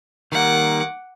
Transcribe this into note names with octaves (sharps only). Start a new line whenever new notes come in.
D#3 G3 A#3 F#5 D6